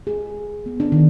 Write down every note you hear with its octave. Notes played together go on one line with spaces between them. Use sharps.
G#4
B3
D4
D#3